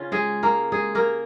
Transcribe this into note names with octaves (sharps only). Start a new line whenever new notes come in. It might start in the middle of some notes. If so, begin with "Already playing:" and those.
Already playing: C#3 C#4 F4
G#3 G#4
A#3 A#4
G#3 G#4
A#3 A#4